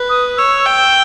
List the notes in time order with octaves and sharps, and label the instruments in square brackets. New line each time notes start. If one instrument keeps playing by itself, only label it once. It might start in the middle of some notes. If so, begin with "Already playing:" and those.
Already playing: [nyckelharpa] B4
[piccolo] D#6
[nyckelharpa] C#5 [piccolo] E6
[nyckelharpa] G5